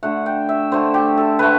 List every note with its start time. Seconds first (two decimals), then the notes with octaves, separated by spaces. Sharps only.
0.03 D3 A3 F#5
0.26 G5
0.49 E5
0.71 D3 A3 C5
0.94 G4
1.17 A4
1.39 D3 A3 B4